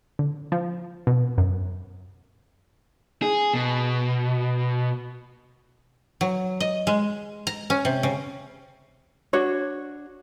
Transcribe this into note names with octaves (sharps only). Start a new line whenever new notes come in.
D3
F3
B2
F#2
G#4
B2
F#3
D#5
G#3
A#5
C#4
C3
C#3
D4 F#4 C#5